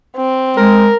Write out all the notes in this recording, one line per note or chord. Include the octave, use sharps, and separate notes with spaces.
C4
G#3 A#4